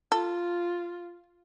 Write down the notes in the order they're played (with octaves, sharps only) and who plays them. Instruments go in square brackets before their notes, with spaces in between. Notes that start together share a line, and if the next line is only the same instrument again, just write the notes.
[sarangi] F4 [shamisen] A4